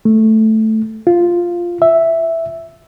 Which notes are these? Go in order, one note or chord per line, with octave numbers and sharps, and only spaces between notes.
A3
F4
E5